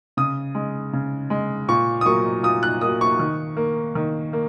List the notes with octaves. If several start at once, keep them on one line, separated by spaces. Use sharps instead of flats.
C#3 D#6
G#3
C#3
G#3
A#2 C#6
D#6
F#3 A#3 C#6
A#2 D#6
F#6
F#3 A#3 D#6
C#6
D#3
A#3
D#3
A#3